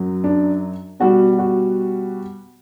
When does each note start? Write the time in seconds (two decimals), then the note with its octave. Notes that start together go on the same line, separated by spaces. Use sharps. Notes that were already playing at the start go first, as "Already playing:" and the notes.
Already playing: F#2 F#3
0.24 D4
1.00 B2 G3 F#4
1.39 F#4